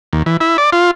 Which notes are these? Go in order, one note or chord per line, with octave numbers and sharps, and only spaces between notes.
D#2
E3
E4
D5
F4